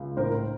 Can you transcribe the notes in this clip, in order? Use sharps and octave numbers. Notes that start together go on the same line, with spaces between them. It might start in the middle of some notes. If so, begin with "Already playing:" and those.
Already playing: C#2
A2 A#4 C5